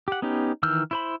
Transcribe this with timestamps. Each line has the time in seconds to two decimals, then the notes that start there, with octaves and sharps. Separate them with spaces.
0.08 G4 F#5
0.22 B3 C#4 D#4 G4
0.63 D#3 E3 E6 F6 G6
0.91 E4 C5 B5